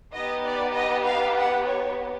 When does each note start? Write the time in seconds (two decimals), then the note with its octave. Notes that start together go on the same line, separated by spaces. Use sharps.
0.14 B3 D#4 G4 D#5
0.45 D5
0.75 D#5
1.06 F5
1.37 F#5
1.68 C#5